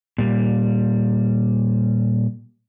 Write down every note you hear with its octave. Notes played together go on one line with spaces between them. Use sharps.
A#2 G3